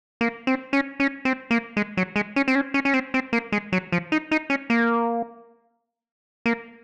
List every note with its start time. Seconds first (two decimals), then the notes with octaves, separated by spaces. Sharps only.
0.21 A#3
0.47 C4
0.73 C#4
1.00 C#4
1.25 C4
1.51 A#3
1.77 G#3
1.97 F#3
2.16 G#3
2.36 C#4
2.48 C4
2.55 C#4
2.74 C#4
2.85 C#4
2.94 C4
3.14 C4
3.33 A#3
3.52 G#3
3.72 F#3
3.92 F3
4.12 D#4
4.31 D#4
4.50 C#4
4.70 A#3
6.46 A#3